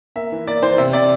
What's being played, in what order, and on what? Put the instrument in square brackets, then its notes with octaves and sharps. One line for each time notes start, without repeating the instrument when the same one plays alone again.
[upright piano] A#3 E5
E3
A#3 D5
E3 C5
C3
C3 D5